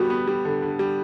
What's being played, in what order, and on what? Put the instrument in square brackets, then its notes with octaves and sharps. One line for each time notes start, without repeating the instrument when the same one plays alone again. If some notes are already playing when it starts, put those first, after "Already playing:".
Already playing: [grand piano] D3 G3 B3 [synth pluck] F#4
[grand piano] B3
G3
D3
D3
G3